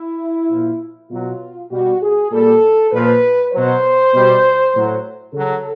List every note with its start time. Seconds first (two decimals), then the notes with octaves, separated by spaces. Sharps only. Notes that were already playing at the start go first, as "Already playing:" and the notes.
Already playing: E4
0.49 A#2 F3
1.10 B2 F#3 F4
1.70 B2 G3 F#4
2.01 G#4
2.31 A#2 G3 A4
2.91 A#2 F3 B4
3.52 B2 F#3 C5
4.12 B2 G3
4.73 A2 F#3
5.33 C#3 F#3 A4